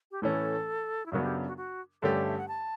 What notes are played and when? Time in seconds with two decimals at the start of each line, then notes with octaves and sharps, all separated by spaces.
0.11 G4
0.22 A2 E3 A3 C#4 A4
1.06 E4
1.12 F#2 C#3 F#3 B3 D4 F#4
1.23 G4
1.46 F#4
1.57 F#4
2.02 G2 D3 A3 C#4 G4 A4
2.14 D5
2.25 E5
2.37 F#5
2.48 A5